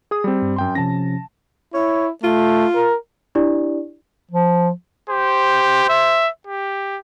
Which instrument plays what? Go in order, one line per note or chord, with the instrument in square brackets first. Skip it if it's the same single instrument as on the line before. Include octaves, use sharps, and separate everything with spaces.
[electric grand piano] G#4 D#6
G3 C4
[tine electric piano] G2
[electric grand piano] F#2 G5 C6
[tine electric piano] C3 F3 C#4 [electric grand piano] A5 A#6
[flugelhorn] E4 [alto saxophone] C#5
[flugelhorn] A3 [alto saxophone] F4
[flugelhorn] A#4
[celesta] D4 E4 G4 D5
[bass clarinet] F3
[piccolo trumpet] G4 [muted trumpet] C5
[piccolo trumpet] E5
G4